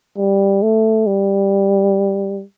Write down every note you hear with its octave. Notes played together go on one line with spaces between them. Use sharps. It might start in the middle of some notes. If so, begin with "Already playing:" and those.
G3
A3
G3